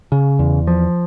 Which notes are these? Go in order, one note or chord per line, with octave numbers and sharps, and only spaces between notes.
C#3
E2
F3